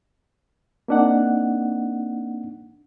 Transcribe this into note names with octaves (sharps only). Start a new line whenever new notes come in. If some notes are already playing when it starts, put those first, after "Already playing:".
A#3 C4 D4 D#4 F#5